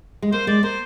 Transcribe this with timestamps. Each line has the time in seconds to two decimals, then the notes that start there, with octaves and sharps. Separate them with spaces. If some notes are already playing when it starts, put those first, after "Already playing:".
0.22 G#3
0.32 A#3 C5
0.47 G#3 D5
0.63 A#3 C5